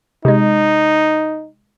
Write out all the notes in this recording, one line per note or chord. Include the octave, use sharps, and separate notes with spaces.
C3 G#3 D#4